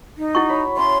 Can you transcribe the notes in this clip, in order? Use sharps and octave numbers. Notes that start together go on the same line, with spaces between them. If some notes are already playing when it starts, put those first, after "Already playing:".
D#4
E4 F#4 C#6
C#5 B5
C#4 E5 C6